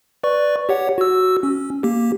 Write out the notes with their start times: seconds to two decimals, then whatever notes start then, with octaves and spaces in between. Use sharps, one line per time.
0.24 B4 D5 C#6
0.69 G4 C#5 F#5
0.98 F#4 E6
1.43 C#4
1.83 A#3 G4